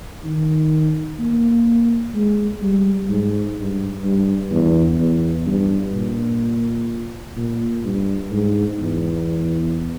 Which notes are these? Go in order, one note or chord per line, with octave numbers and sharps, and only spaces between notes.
D#3
A#3
G#3
G3
G#2
G2
G2
E2
E2
G2
A#2
A#2
G2
G#2
E2